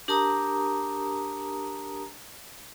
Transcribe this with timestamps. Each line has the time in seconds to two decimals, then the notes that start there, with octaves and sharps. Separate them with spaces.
0.08 D4 G4 A#4 A5 A#5 D#6